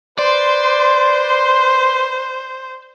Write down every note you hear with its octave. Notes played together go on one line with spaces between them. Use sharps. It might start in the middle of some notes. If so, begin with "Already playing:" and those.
B4 C5 D5 C6